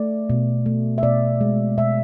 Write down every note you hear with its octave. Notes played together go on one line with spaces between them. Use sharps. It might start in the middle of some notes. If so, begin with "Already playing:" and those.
Already playing: A3 D5
B2
A3
E5
B2 D5
G#3
B2 E5